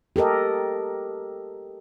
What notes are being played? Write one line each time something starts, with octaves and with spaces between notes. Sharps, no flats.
G4 A4 A#4 D#5